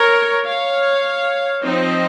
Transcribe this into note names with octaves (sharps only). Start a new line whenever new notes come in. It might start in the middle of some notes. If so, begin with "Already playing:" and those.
Already playing: A#4 C#5
C#5 F5
F3 C4 D#4 C5 D#5